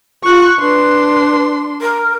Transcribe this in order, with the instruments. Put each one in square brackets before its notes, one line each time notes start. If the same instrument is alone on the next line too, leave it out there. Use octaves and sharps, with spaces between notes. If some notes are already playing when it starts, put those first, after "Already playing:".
[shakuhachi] F4 [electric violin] C#6 F#6
[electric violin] D4 C6 [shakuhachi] B4
[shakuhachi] A#4